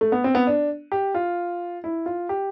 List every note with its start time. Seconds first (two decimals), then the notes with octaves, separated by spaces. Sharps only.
0.01 A3
0.12 B3
0.24 C4
0.35 B3
0.47 D4
0.92 G4
1.15 F4
1.84 E4
2.06 F4
2.29 G4